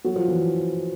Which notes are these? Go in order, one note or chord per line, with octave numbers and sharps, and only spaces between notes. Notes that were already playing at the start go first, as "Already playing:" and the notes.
F#3
F3
E3